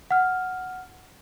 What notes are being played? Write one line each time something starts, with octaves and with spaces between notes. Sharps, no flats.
F#5 F6